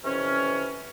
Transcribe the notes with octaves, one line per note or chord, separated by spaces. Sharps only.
F2 C3 E3 C#4